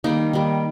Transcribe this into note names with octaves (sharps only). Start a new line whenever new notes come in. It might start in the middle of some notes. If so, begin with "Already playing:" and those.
D#3 G3 A#3 D#4
D#3 G3 A#3